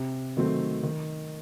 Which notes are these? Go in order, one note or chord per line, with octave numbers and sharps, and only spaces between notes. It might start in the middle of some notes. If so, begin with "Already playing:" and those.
Already playing: C3
D#3 F#3 A3 C4
D#3